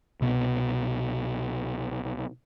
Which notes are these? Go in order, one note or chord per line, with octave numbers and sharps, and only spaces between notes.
C2 B2 B3